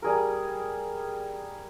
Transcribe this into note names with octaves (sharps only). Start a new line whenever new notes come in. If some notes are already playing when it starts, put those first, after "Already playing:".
G3 G#4 A#4